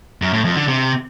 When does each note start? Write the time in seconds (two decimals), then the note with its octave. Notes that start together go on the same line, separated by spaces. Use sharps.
0.22 F#2
0.33 A2
0.45 F2
0.56 D3
0.68 C3